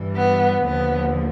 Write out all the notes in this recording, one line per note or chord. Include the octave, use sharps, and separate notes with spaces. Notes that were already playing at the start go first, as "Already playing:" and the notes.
Already playing: G2 E3 G3
B3
D#2 D3 F3 B3